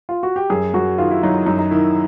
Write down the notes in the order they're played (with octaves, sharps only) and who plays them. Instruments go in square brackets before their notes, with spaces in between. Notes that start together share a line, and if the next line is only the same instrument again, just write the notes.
[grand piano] F4
F#4
G4
[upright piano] F#2 [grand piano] G#4
[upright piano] F#2 [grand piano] F#4
[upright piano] D#3 [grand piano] F4
[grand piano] E4
[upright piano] F#3 [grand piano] D#4
[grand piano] E4
[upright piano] F#2 [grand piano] D#4
[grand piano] D#4
[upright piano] D#3 [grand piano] E4